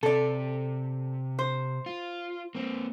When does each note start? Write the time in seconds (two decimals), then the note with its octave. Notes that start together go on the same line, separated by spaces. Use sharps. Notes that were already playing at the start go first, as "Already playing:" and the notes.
0.03 C3 A4 D5
1.39 C5
1.86 F4
2.55 A#3 C4